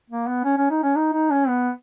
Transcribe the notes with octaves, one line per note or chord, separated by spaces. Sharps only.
A#3
B3
C#4
C#4
D#4
C#4
D#4
D#4
C#4
B3